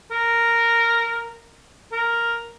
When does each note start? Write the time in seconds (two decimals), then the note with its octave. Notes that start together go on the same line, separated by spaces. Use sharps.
0.11 A#4
1.92 A#4